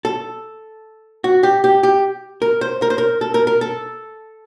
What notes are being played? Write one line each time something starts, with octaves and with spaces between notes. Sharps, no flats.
A4
F#4
G4
G4
G4
A#4
C5
A#4
C5
A#4
A4
A#4
A#4
A4